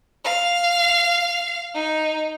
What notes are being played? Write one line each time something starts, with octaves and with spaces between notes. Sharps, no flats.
F5
D#4